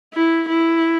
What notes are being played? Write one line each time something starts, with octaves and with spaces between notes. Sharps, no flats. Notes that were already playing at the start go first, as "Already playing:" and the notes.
E4
E4